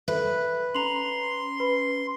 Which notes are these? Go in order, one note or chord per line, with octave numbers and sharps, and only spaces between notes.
A4 B4 E5 F#6
C#4 A#5 C6 F7 F#7
B4 B5